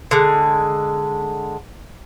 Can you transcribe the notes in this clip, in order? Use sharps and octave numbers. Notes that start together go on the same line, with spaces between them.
D3 G#3